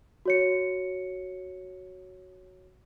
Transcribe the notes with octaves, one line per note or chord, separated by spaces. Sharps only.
F#4 C#5 C#7